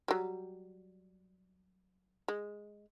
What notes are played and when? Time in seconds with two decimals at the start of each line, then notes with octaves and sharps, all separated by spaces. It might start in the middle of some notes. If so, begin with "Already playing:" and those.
0.08 F#3 G3
2.28 G#3